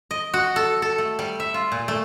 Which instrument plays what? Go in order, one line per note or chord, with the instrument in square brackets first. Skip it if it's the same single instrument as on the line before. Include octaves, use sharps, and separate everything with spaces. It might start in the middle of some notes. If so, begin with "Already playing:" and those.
[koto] D#5
F#4
A4
A4
A3
G3
E5
F4
A#2
A3